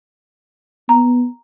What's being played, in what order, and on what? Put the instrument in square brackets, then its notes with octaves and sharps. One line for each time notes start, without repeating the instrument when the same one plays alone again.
[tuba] B3 [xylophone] A#5